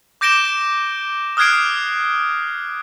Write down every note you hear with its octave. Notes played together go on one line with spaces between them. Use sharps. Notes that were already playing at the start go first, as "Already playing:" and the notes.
D6 G6 A#6 D7 E7 G7
D#6 F6 F#6 G#6 C7 D7